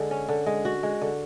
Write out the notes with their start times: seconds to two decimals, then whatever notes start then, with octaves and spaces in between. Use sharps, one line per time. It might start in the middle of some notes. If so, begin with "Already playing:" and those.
Already playing: D3 G#3 G#4
0.11 C#4
0.29 D3
0.46 G#3
0.65 F#4
0.83 G#3
1.01 D3